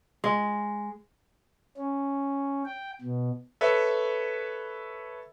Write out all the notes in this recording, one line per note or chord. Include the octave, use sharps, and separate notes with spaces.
G#3
C#4
G5
B2
A4 B4 C#5 E5